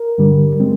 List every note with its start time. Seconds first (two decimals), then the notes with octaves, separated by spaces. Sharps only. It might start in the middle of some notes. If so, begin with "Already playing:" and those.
Already playing: A#4
0.18 G2 D3 G3
0.60 G#3 C4